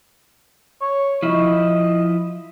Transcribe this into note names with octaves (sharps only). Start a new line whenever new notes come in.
C#5
F3 E4 D#5